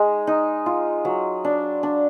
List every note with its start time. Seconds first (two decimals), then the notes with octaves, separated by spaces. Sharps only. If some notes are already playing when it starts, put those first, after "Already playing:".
Already playing: G#3 D#4
0.27 D#4
0.66 F4
1.05 F#3
1.45 D4
1.83 D4